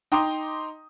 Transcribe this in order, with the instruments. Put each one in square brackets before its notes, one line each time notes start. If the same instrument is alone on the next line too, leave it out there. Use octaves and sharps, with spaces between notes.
[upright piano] D#4 G5 A#5 C6 D6 D#6